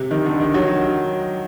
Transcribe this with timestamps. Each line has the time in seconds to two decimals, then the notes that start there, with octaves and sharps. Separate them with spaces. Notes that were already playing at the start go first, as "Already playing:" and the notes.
Already playing: C3
0.11 D#3
0.26 D3
0.40 D#3
0.54 F#3